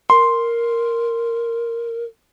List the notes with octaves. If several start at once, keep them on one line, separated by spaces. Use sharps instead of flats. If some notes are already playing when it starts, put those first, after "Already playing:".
A#4 C6